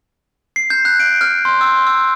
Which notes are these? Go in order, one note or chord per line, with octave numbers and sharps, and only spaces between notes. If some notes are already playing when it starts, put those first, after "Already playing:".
C7
G6
F#6
D7
F6
C6
E6
E6